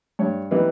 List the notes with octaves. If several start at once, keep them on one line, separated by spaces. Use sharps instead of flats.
G2 C#5
E3 G3 B3 D#4